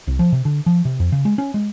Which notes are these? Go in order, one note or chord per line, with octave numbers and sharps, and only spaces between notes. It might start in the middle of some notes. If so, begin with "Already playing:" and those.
C2
F3
C3
D3
F3
C3
F2
C#3
G#3
C#4
G#3